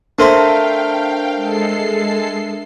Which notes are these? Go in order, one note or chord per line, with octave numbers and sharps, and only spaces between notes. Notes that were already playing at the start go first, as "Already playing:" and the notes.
A3 C4 D4 A#4 C5 E5 F5 G5
G#3 A4 C7